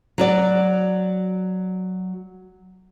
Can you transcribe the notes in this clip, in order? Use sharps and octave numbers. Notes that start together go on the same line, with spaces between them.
F#3 F#4 D5